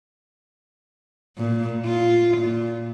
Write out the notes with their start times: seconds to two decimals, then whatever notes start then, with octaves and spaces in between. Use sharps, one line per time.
1.37 A#2
1.85 F4
2.38 A#2